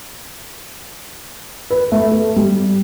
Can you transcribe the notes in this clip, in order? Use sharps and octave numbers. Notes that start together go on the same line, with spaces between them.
B4
A3
A4
G3